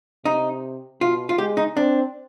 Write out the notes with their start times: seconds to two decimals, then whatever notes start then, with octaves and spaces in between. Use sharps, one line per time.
0.25 C3 D#4
1.01 B2 F4
1.29 F4
1.38 G#3 G4
1.57 D#4
1.77 C4 D4